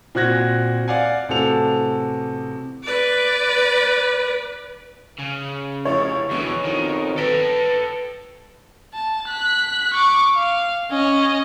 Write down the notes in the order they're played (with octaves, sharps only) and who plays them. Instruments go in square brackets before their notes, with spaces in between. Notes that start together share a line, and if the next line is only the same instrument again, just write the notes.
[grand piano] A#2 C4 F#4 F#6 G#6 A#6
D5 F5 F#5 G#5
A1 C3 F#4 A4 F7
[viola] B4 D5
[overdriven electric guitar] C#3
[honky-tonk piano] F1 F3 E4 [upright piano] C#5
[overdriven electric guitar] E2 E3 [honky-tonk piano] B2 D3
[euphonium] F2 [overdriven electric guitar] D#3
[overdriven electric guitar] A4 G5 [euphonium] B4 [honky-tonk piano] A#6 B6 D7
[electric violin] A5
F#6 B6
C#6 D6
F5
C#4 D#5